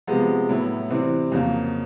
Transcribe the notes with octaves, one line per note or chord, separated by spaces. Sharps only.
C3 F3 G#3 B3
A2 F#3 B3 E4
C3 E3 G3 C4
F2 C#3 F#3 A#3